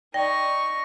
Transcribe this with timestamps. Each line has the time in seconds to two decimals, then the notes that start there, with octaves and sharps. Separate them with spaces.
0.14 D#4 D5 G5 C#6 A#6